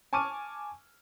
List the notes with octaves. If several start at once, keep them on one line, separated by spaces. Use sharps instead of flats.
G#5 A5 C#6 D6 F6 D#7